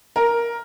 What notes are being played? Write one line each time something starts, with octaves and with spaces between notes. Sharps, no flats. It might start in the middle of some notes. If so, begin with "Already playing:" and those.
A#4